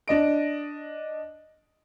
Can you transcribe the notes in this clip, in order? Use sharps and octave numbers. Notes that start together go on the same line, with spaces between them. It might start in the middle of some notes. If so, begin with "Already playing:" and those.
D4 D#5 D7